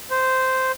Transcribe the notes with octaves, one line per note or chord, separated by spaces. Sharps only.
C5